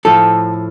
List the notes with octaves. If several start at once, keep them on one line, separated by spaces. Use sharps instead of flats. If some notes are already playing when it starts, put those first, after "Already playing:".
A2 F3 A4